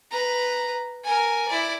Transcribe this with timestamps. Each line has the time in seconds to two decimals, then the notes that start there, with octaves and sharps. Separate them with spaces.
0.11 B4 A#5
1.03 A#4 G#5
1.48 E4 D5